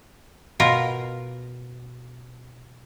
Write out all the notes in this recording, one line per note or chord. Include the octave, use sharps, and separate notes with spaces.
B2 F4 A#4